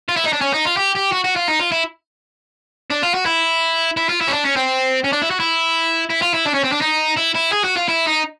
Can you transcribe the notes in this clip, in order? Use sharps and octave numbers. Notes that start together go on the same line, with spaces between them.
F4
E4
D#4
D4
C#4
D#4
F4
G4
G4
F#4
F#4
F4
D#4
F4
E4
D4
F4
F#4
E4
E4
F4
E4
C#4
D4
C#4
C4
C#4
D4
E4
F#4
E4
E4
F4
E4
D4
C#4
C4
D4
D#4
E4
E4
G#4
F#4
F4
E4
D#4